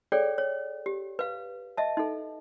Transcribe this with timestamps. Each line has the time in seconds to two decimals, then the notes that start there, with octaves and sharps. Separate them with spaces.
0.12 G#4 A4 C#5 D5 G5
0.38 C#5
0.86 G4
1.19 B4 F5
1.77 D#5 E5 A5
1.97 D#4 A4